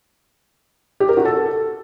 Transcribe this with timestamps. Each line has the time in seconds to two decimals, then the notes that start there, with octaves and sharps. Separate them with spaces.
1.00 G4
1.09 A#4
1.17 F#4
1.25 A4